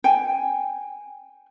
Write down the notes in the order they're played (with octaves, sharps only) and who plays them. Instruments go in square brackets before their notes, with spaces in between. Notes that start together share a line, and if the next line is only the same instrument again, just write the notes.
[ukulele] G5 G#5